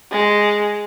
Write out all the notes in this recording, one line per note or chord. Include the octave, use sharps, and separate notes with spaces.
G#3